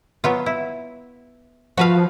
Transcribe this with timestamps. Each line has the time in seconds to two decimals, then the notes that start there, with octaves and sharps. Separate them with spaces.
0.24 F#3 B3 F4
0.46 E4
1.77 F3 F#4 B4 F5